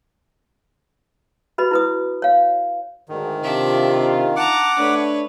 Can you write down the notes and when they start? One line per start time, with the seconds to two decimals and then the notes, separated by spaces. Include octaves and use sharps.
1.58 F#4 B4 D#5 B5
1.71 E4 B4 D#6
2.22 C#5 F5
3.09 D2 G#2 D#3
3.43 C3 D4 D#4 F4 E5
4.36 F#5 A5 A#5 D6
4.79 A3 D4 B4 C#5